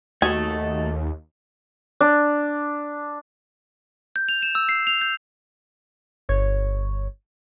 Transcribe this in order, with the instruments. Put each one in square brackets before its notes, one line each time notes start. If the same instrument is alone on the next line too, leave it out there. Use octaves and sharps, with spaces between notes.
[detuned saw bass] D#2 [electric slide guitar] A3 A4 [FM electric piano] F#4 D#5 [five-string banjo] G#5
[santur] D4
[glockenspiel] G6
F7
E7
E6
C7
F7
G6
[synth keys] G1 C#5